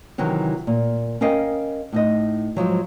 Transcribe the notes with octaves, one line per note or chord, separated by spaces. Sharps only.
C3 D#3 E3 F#3 F#4
A#2
C#4 A#4 D#5 F5 G5
A2 D#4 D#5
G#2 B2 F3 F#3